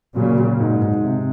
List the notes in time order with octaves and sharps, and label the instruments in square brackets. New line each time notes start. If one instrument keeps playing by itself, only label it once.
[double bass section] A#2 C#3 [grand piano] F#3
[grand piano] F#3
G#2
G#2
C3